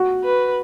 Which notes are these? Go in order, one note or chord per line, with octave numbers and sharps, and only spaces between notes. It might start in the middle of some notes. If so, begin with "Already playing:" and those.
Already playing: F#4
B4